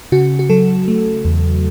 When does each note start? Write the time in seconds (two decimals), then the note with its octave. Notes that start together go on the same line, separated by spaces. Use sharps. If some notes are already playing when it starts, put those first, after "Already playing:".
0.12 C#3 F#4
0.39 F#4
0.50 F#3 A4
0.88 A3
1.25 E2